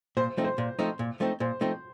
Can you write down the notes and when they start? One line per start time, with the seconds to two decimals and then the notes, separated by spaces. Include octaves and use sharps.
0.17 A#2 C5
0.37 F3 A3 C4 D#4
0.44 C5
0.58 A#2
0.79 F3 A3 C4 D#4
0.99 A#2
1.20 F3 A3 C4 D#4
1.40 A#2 C5
1.61 F3 A3 C4 D#4